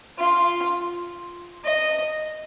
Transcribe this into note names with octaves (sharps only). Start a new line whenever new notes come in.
F4
D#5